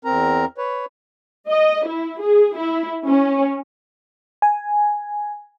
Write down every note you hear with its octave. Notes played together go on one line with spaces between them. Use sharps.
E2 C4 A#4 A#5
B4 C#5
D#5
E4
G#4
E4
C#4
G#5